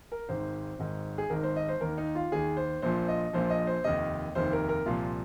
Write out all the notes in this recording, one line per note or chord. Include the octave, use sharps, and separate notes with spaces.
A#4
G#1 G#2 D#3 C5
G#1 G#2 D#3
G#4
G#1 G#2 D#3 A#4
C5
D#5
C5
D#2 D#3 A#4
D#4
F4
D#2 D#3 G#4
C5
A#1 A#2 F3 C5
D#5
A#1 A#2 F3 C5
D#5
C5
F1 D#2 D#3 D#5
F1 D#2 D#3 C5
A#4
A#4
C2 A#2 F3 F4